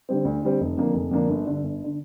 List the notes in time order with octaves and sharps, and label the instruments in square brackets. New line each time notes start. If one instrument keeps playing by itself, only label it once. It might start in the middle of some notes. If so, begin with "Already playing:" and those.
[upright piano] D3 G3 C4
D2
D3 G3 C4
F1
F2 D3 A#3 D4
F1
F2 D3 A#3 D4
G1
G2 D3
G1
D3